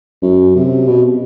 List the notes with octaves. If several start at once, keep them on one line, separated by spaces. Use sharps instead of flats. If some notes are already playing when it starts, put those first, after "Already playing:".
F#2
C3
B2